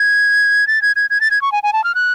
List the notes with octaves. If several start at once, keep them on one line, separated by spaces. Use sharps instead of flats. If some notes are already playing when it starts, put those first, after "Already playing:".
Already playing: G#6
A6
G#6
G#6
G#6
A6
G#6
C#6
G#5
G#5
A5
F6
F#6